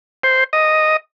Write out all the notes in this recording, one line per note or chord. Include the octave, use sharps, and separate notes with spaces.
C5
D#5